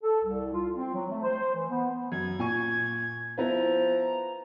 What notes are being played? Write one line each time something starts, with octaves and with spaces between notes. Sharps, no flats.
A4
C2
F4
C4
F#3
A3
C5
E3
B3
F#2 G#6
A#2 G#5 C#6
F3 B3 E4 B4 A#5